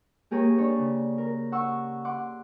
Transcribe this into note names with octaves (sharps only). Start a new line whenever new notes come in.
A#3 G4 G#4 A#4 C#5
D4 C#5
C#3
A#4
F#5 C#6 E6
F#5 C6 D6